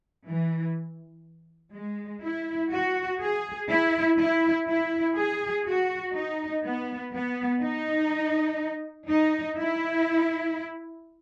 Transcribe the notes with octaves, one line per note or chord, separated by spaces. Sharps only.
E3
G#3
E4
F#4
G#4
E4
E4
E4
G#4
F#4
D#4
B3
B3
D#4
D#4
E4